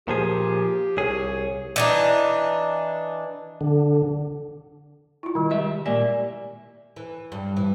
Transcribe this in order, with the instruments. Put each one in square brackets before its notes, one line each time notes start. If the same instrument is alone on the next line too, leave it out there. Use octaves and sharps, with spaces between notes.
[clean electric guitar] A#2 F3 G#4 [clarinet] G4
[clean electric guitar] C2 G#4 [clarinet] C#5
[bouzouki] E3 D4 D#4
[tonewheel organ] D3
[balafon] E4 F4
[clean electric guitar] C2 [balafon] D#3 G3
[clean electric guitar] G#3 G4 E5 [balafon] D#5
[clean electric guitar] A#2 A#3 G4 [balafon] D5 G#5
[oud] E3
G2
E3